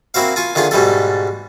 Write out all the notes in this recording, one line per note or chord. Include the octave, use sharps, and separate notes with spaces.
A#3 C4 E4 F#4 C5 F5
F4 G#5 C#6
D3 D#3 A3 F4 G#4
G#2 B2 G3 A3 A4